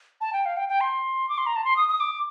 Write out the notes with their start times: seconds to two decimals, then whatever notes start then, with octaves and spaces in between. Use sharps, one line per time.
0.21 A5
0.33 G5
0.45 F5
0.57 G5
0.69 G5
0.81 C6
1.29 D6
1.38 C6
1.46 A#5
1.56 A5
1.65 C6
1.77 D#6
1.89 D#6
2.00 D6